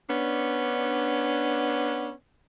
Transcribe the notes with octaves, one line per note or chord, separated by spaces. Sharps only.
B3 C#4 D4